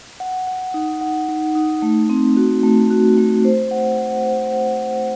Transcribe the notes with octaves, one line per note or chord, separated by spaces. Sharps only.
F#5
F#5
D#4
F#5
D#4
D#4
A3
C4
F#4
A3
F#4
A3
C5
F#5
F#5
C5
F#5